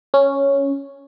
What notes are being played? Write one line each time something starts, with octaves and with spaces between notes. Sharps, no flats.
C#4